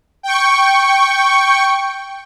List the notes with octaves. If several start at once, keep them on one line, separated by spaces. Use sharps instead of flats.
G5 C#6